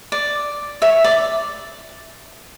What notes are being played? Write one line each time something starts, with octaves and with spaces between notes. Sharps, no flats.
D5
C#5 E5
D5